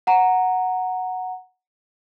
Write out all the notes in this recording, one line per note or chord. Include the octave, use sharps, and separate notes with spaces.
F#5 A#5